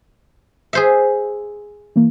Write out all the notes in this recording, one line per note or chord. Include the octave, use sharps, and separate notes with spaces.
G#4 C5 E5
E3 A#3